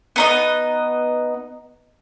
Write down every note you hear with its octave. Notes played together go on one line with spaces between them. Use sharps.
B3 D#4 D#5